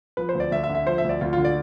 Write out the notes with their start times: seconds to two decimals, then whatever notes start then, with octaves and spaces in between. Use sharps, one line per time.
0.17 F3 B4
0.29 C5
0.35 D2
0.40 D5
0.52 D2 E5
0.64 E5
0.69 D3
0.75 E5
0.86 F3 C5
0.98 E5
1.05 D2 D5
1.21 D2 F4
1.33 F4
1.38 D3
1.45 D5